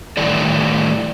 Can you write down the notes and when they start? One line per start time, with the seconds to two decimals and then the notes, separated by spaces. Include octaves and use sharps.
0.17 A2 D#3 E3 G3 A4 D5